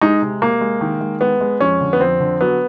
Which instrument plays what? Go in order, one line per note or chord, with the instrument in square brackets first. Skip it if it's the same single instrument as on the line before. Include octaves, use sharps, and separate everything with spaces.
[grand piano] G#3 D#4
C3
C3 A#3
G#3
D#3
G#3
G#3 B3
G#3
F2 C#4
D3
B3
F2 C4
D3
F#3 B3